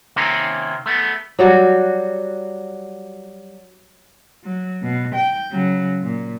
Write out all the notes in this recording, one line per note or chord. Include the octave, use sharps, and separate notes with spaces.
C3 D#3 A#3 C4 C#4
A3 B3
F#3 G3 F#4
F#3
B2
G5
C#3 F#3
A#2